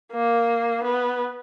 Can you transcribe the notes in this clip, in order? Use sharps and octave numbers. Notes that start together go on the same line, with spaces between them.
A#3
B3